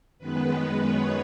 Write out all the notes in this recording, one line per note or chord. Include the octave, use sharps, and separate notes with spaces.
F#2 D#3 G#3 B3 B4
C#5